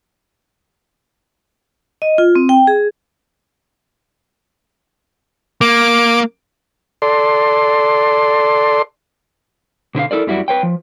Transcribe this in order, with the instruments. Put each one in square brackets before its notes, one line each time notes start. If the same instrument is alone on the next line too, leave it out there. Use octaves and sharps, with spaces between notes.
[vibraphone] D#5
F4
C4
G5
G#4
[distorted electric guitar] A#3 [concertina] D6
[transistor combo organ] A4 D5 C6
[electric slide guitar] B2 D3 B4 F5
E4 A4 A#4 D5
F#2 G3 E4 F#4 D5
B4 C#5 G5
F3